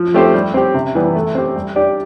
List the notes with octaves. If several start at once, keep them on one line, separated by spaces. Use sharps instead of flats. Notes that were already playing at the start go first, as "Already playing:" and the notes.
Already playing: F3
A3 C4 G4 C5
G3
C4 G4
C3
E3 G3 B3
A3
C4 G4
G3
D4 G4 D5